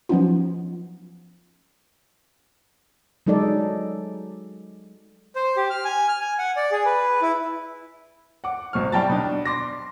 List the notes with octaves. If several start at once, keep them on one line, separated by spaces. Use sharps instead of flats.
F3 F#3 B3 C#4 D#4 F4
F#3 G#3 D#4 A4 D5
C5
G4
F6
G#5
F6
G#5
F#5
D5
G#4
B4
E4
F#5 D6
G#1 B2 C#6 F6
G3 E4 G5 A5 A#5 A6
B2 D4
C6 D6 A#6